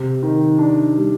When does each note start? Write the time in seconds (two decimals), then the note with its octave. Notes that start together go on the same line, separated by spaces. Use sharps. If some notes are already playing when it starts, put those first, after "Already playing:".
Already playing: C3
0.23 D#3
0.59 D4
0.96 G3